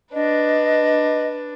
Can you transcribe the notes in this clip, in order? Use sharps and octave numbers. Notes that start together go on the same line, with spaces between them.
D4 B4 D#5